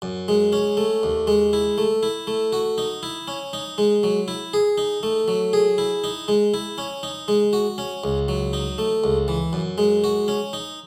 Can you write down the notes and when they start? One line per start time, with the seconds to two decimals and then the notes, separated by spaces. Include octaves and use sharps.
0.02 F#2
0.28 G#3
0.53 C#4
0.77 A3
1.03 D#2
1.27 G#3
1.53 E4
1.78 A3
2.03 E4
2.27 A3
2.53 F#4
2.78 D#4
3.03 E4
3.28 C#4
3.53 D#4
3.78 G#3
4.03 F#3
4.28 E4
4.53 G#4
4.78 D#4
5.03 A3
5.28 F#3
5.53 G#4
5.78 E4
6.04 D#4
6.28 G#3
6.54 E4
6.78 C#4
7.03 D#4
7.28 G#3
7.53 F#4
7.78 C#4
8.04 C#2
8.28 F#3
8.53 D#4
8.78 A3
9.04 C#2
9.28 E3
9.53 F#2
9.78 G#3
10.04 F#4
10.28 C#4
10.53 D#4